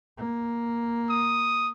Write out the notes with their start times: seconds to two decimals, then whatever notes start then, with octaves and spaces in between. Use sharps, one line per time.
0.18 A#3
1.10 D#6